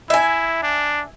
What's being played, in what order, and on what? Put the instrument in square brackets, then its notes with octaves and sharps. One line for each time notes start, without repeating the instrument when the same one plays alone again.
[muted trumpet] E4 [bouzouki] E5 G#5
[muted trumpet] D4